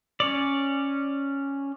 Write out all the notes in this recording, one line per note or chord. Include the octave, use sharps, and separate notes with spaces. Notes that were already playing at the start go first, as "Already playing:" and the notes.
C#4 C#5 D5